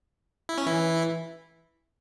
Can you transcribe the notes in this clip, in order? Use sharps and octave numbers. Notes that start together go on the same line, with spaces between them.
E4
C#4
E3 E4